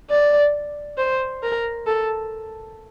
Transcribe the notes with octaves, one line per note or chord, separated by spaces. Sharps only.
D5
C5
A#4
A4